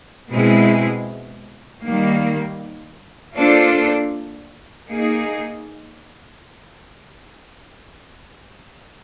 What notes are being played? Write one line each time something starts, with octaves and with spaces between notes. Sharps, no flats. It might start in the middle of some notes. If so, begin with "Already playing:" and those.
B2 G#3 C4 E4 G#4
D#3 G3 A#3
A#3 D4 F4 A4 C5
A#3 D#4 G#4